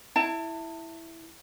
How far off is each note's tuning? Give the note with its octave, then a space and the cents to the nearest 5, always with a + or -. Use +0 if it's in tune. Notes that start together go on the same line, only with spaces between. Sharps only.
E4 +0 A5 +30